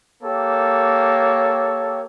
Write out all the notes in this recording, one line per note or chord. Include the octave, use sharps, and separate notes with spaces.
A#3 G4 A4 C#5